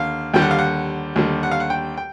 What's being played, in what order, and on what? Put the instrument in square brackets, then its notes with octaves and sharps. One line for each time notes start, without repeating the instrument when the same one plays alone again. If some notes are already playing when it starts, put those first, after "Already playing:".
Already playing: [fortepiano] D#2 D3 F5
D#2 D3 G3 G5
F#5
F5
F#5
D#2 D3 G3
F#5
F5
F#5
G5
G5